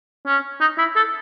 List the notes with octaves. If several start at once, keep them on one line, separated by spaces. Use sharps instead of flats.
C#4
D#4
E4
A4